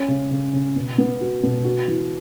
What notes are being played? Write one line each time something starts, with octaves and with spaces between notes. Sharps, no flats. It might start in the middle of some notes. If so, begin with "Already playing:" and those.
Already playing: C#4
C#3
C#3
C#3
B2
B3
F#4
B2
F#4
E3